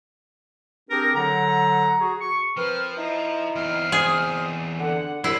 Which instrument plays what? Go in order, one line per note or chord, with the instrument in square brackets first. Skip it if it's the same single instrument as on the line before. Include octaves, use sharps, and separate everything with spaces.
[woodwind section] C4 D4 G4 G#4 A#4
D3 F#3 F#5 A#5
F#4 G#4
C#6
[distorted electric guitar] F3 [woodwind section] C4 A#4 B4 [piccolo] F6
[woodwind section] D#4 E4 [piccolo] A#5
[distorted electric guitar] E2 C4 [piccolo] F6
[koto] G#4 [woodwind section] C5 D#5 D#6
[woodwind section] D3 [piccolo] F#5
[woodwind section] C2 [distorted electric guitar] F#3 F4 [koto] E4 [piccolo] C7